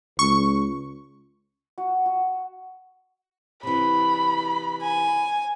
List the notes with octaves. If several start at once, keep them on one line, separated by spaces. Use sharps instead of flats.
C#2 C#6
F#4
F#4
C3 E3 B5
G#5